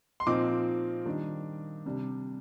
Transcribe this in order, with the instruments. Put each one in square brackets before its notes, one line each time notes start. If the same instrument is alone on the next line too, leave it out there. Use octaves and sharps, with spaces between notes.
[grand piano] C6
A#2 F3 C4 D#4 D6
D#3 G3 D4
C3 G3 D4